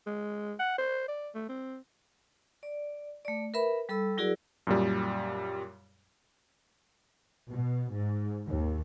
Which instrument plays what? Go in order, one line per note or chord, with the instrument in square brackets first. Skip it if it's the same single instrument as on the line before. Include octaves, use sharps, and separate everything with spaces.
[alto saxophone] G#3
F#5
C5
D5
A3
C4
[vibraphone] D5
A3 D5
A#4 B4 E5 B5
G3 A4 B5 E6
F#3 E4 F#4 G#4 A#4 D5
[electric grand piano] F#2 A#2 G3
[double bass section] B2
G#2
D#2